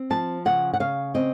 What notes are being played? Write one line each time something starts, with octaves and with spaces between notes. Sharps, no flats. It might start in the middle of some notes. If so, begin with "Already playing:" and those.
Already playing: C4
F3 A5
C#3 F#5
F#5
C#3 F5
C4 D#5